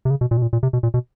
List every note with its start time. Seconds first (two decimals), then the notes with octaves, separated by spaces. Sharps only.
0.05 C3
0.10 C#3
0.21 B2
0.31 A#2
0.37 B2
0.42 A#2
0.53 A#2
0.63 C3
0.73 B2
0.83 A#2
0.94 B2